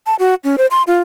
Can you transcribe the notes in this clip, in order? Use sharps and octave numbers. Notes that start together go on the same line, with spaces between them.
A5
F#4
C#4
C5
C6
F4